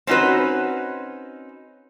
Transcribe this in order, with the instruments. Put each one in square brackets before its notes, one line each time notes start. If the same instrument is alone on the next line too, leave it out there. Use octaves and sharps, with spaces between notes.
[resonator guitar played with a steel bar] C4 C#4 D#4 F#4 B4